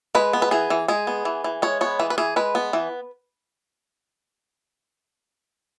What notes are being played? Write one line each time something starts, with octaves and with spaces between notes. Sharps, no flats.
G#3 B4
B3
B4
E3 G#4
E3
G#3 G#4
B3
E3
E3
G#3 C#5
B3 C#5
E3 B4
B4
E3 G#4
G#3 B4
B3
E3